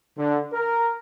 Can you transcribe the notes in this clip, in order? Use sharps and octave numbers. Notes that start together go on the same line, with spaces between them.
D3
A#4